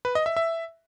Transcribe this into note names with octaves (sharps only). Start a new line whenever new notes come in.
B4
D#5
E5
E5